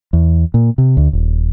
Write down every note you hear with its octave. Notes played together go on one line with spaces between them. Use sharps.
E2
A#2
C3
D2
D#1